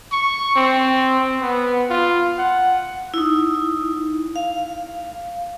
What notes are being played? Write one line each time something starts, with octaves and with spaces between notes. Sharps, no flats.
C#6
C4
B3
F4
F#5
D#4 E4
F5